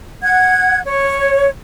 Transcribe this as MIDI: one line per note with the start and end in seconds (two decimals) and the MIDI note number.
0.22 0.80 78
0.22 0.80 92
0.85 1.50 73